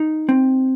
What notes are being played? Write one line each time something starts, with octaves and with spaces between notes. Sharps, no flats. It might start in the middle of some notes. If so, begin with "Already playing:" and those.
Already playing: D#4
C4